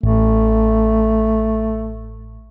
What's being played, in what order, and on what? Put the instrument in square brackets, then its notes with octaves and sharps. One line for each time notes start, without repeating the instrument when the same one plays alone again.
[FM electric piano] A1 [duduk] A3